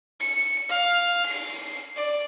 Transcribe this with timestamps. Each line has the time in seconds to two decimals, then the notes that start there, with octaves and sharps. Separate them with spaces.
0.20 C#7
0.69 F5
1.26 C7
1.96 D5